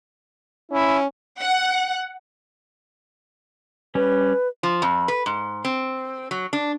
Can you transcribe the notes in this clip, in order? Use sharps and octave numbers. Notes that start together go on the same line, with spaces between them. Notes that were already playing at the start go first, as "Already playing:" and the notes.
C#4 E4
F#5
G3 C#4 B4
F3
F2
B4
G#2
C4
F#3
D4